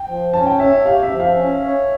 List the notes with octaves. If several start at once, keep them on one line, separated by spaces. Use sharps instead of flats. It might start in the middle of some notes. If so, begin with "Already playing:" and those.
Already playing: G5
F3
C#4 A5
G5
C#5 E5
E5
G4 F5
E5
F3
F5
C#4
C#5